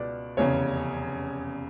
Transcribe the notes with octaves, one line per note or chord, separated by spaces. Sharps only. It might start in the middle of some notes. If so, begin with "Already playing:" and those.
Already playing: C#2 B2 D5
F1 E2 C#3 C#5